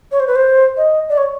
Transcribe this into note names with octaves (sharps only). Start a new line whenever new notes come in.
C#5
C5
B4
C5
D#5
D5
C#5